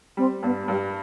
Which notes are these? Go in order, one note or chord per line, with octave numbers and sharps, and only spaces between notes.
G3 C4
G2 B3
G2 G3